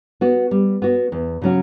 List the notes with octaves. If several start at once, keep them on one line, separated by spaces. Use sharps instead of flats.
B3 F#4
G3
B3 F#4
E2
C#3 F#3 C#4 F#4